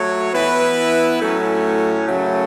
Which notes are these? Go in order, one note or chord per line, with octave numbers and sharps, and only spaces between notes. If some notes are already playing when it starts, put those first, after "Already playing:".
Already playing: F#3 A3 F#4 C#5
E3 B3 E4 B4
A2 F#3 A3 C#4
F#2 C#3 F#3 A3